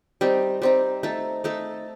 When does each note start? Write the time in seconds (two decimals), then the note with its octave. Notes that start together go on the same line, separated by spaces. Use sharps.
0.21 G3 C4 D#4
0.62 G3 C4 D#4
1.03 A3 D#4 A4
1.44 A3 D#4 A4